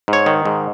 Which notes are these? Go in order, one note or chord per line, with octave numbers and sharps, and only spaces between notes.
G#2
C#5
D#3
G#2